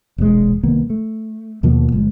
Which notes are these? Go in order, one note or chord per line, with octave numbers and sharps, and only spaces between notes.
E1 A#1 A#2 G#3
C2 D#3 A#3 B3
A3
D#2 B2 F3 A#3
G1 G#3